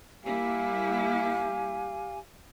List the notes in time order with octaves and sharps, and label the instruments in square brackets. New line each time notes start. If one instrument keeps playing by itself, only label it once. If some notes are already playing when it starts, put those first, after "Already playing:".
[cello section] G3 A#3 E4 [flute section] G4 G#5 [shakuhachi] F5